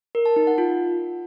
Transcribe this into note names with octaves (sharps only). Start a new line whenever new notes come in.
A#4
A5
D#4
F#5
F4